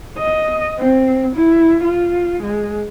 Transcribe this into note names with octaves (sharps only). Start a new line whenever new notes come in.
D#5
C4
E4
F4
G#3